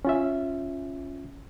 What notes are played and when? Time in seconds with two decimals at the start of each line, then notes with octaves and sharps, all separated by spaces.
0.05 C#4 F4 E5